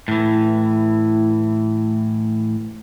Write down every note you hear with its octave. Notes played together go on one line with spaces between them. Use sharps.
A2 E3